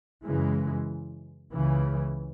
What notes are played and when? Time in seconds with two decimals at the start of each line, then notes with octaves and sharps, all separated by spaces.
0.24 F#2 C#3 E3 G#3
1.52 C#2 C#3 E3